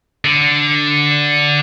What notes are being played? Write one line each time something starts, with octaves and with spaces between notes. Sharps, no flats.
D3